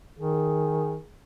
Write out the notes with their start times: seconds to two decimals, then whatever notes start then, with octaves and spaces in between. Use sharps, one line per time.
0.19 D#3 G#4